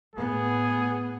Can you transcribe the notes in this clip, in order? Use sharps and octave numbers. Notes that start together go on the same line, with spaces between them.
A2 B3 G#4